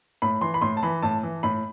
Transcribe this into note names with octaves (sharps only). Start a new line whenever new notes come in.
A2 B5
E3 C6
B5
A2 C6
A5
E3 B5
A2 A5
E3
A2 B5